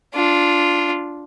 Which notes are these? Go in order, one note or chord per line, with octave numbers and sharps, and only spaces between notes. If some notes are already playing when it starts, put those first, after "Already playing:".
D4 F4